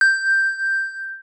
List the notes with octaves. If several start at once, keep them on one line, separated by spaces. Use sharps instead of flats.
G6